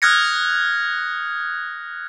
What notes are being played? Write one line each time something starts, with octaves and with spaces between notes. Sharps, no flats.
D#6 F6 F#6 G#6 A#6 C#7